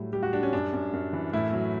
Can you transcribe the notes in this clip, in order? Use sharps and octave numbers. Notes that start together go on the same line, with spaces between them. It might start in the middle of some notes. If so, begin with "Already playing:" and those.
Already playing: A2 F#3 G3
G3 G4
F#4
G3 D4
C#4
F#2 D4
F#2
F#2
E3
A2 E4
F#3